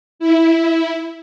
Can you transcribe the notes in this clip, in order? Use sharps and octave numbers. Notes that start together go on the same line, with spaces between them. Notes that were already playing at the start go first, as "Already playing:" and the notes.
E4